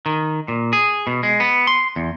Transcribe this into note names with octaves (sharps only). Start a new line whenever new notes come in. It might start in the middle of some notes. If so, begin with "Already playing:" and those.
D#3
A#2
G#4
B2
G#3
B3
C6
E2